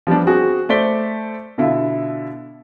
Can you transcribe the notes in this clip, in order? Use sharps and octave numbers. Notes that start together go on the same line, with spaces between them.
F3 G3 B3 D4
C4 F#4 G#4
A3 C5 D5 B6 G7
B2 D3 E4 F4